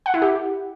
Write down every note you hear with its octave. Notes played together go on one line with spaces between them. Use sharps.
F#5
E4
G4